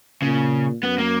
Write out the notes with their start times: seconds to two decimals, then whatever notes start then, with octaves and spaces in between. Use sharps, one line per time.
0.22 A#2 C#3
0.83 F#2 B3
0.98 A#3